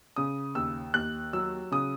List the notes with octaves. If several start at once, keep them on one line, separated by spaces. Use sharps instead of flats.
C#3 D#6
D#2 E6
D#2 F#6
F#3 E6
C#3 D#6